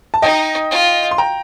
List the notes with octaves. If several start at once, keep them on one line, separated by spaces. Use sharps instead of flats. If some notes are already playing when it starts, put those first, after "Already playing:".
A5
D#4 D#5 G5
F4
C6
G5 A#5